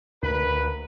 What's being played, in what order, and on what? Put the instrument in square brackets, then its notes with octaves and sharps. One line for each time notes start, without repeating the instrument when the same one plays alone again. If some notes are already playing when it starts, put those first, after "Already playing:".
[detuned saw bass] D2 [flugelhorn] A#4 [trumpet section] B4